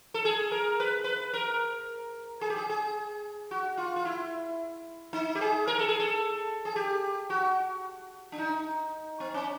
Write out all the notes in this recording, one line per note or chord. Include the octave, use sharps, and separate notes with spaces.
A4
G#4
A#4
B4
B4
A#4
G#4
G4
G#4
G#4
F#4
F4
F4
E4
D#4
G4
G#4
A#4
A4
G#4
A4
G#4
G4
F#4
D4
D#4
C4
C#4